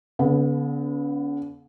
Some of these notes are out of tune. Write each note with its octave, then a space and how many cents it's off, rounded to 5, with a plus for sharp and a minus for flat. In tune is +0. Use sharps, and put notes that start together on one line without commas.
D3 -45 B3 +0